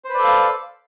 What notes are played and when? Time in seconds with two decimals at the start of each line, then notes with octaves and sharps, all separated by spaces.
0.04 C5
0.09 B4
0.14 D5
0.19 A4
0.24 F5